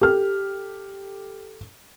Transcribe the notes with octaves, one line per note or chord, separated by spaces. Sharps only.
G4 A4 F6